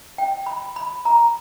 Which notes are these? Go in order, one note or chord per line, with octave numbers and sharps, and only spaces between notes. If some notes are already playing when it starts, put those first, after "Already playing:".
G5
B5
B5
A#5